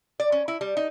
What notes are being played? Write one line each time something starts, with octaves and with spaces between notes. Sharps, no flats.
D5
C#4
E4
G3
D#4